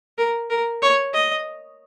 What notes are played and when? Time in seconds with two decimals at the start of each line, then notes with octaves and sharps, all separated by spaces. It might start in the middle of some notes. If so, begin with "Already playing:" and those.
0.18 A#4
0.50 A#4
0.82 C#5
1.14 D#5